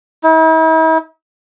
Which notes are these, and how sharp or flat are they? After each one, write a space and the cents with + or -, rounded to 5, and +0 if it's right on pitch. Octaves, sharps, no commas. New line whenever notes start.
E4 -45